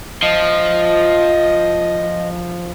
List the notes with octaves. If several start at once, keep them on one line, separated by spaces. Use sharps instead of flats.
F3 D#5